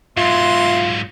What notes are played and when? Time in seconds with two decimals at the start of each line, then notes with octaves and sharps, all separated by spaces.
0.17 G#2 B2 F#3 F4 E5 C6